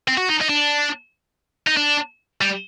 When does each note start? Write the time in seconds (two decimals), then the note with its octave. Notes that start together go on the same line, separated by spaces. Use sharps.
0.08 C4
0.17 F#4
0.29 D#4
0.41 D#4
0.49 D4
1.67 D#4
1.77 D4
2.41 G3